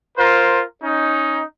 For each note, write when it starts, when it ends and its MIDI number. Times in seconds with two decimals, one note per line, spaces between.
0.18 0.63 65
0.18 0.63 70
0.18 0.63 72
0.83 1.42 61
0.83 1.42 63